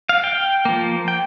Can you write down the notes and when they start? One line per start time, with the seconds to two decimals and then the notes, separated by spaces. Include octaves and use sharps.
0.09 F5
0.24 G5
0.65 F3 A#3
1.08 G5